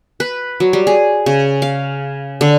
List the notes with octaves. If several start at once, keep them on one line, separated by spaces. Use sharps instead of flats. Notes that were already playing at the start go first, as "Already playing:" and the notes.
B4
F#3
G3
G#4
C#3
F5
D3